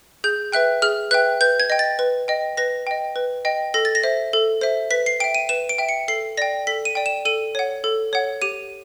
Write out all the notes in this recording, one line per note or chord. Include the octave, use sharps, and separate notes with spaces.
G#4 G6
B4 E5 G5 F#6
G#4 F6
B4 E5 G5 F#6
B4 G6
G#6
D#5 G5
A6
B4
D#5 G5
B4 A#6
D#5 G5
B4
D#5 G5
A4 A#6
A6
A#6
C5 E5
A4
C5 E5
B4 B6
C7
E5 G5 D7
D#7
B4 E7
D7
E5 G5
C#7
A4 C7
D5 G5 A#6
A4 B6
D#7
D5 G5
E7
A4 D#7
C#5 F#5
A4
C#5 F#5
G4 D#7